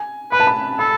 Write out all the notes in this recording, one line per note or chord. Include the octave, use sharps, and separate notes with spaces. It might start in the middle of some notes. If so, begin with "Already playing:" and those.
Already playing: G#5
B4 B5
A5
B5
A4 B5